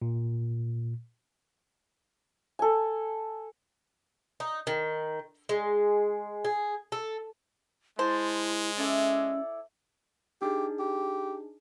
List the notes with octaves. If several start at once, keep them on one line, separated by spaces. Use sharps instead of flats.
A#2
A4 G#5
D#4
D#3
G#3
G#4
A4
G#3 E4 C5 A5
C#4 E4 A4 D5
D4 D#4 G4 G#4
G4